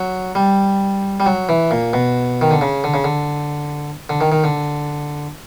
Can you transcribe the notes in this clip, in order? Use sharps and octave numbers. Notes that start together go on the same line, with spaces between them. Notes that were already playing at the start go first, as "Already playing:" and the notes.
Already playing: F#3
G3
G3
F#3
E3
A#2
B2
D#3
D3
C#3
D3
C#3
D3
D3
D#3
D#3
D3